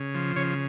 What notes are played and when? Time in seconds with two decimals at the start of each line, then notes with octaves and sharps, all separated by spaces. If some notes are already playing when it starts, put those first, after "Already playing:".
Already playing: C#3
0.15 F3
0.36 C#3 C#5